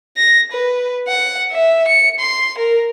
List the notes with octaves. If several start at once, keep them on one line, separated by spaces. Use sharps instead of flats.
A#6
B4
F#5
E5
C#7
C6
A#4